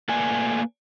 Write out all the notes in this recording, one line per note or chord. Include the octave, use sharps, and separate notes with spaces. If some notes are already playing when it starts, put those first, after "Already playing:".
A3 A#3 B4 D5 G#5